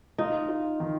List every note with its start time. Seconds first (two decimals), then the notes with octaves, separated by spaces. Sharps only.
0.18 D#4 F4
0.49 F4
0.80 D#3